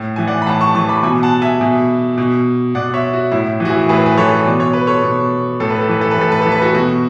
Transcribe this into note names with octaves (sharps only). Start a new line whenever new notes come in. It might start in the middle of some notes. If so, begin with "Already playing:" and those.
Already playing: A2
E3 G#5
D5 F#5
B5
A2 F#5 A5
A5 C#6
E3 A5 C#6
B5 D6
B2 G#5 B5
F#5 A5
E5 G#5
B2
B2
B2 D5 F#5
C#5 E5
F#4
A2 E4
E3
F#4
E4 G#4
A2 G#4 B4
B4
E3 A4 C#5
B2 D5
C#5
B4
A4 C#5
B2
A2 A4
B4
A4
E3 B4
A4
B4
A2 A4
B4
E3 A4
B4
F#4 A4
B2 F#4